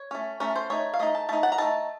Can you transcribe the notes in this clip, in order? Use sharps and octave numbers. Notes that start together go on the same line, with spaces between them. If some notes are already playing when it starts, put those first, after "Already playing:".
Already playing: C#5
A3 C#4
A3 C#4 A#4
C5
A3 D#4 C#5
F5
A3 D#4 D#5
A5
A3 D#4 A5
F#5
A#5
A3 D#4 A5